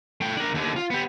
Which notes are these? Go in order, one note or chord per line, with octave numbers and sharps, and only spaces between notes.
A3 G5
D4 A#4
D#2 D3
F4
B3 G4